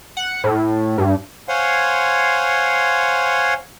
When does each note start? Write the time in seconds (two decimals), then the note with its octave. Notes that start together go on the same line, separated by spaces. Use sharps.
0.17 F#5
0.44 A2
0.98 G2
1.49 C5 C#5 F5 F#5 G#5 C6